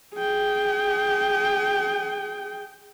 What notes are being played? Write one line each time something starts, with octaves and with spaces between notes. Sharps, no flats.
G#4 G5